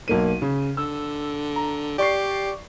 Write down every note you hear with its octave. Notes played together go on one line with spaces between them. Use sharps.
B1 A#3 D#7
C#3
D3 E6
A#5
G4 D5 C#6 C7